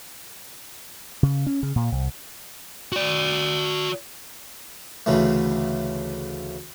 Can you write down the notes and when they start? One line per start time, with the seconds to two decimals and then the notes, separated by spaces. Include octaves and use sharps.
1.23 C#3
1.47 C#4
1.63 C#3
1.76 A#2
1.92 C2
2.93 F#4 D5
5.06 D2 C#3 E3 A3